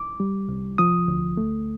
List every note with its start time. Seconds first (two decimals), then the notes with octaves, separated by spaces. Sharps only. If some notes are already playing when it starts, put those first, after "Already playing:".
Already playing: D6
0.20 G3
0.49 C2
0.78 F3 D#6
1.08 D2
1.37 A3